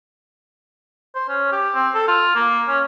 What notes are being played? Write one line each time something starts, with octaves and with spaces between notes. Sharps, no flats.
C5
C#4
G4
C4
A4
F4
A#3
C#4